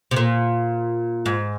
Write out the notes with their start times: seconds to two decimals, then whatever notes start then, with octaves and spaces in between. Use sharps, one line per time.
0.11 C3
0.16 A#2
1.26 G#2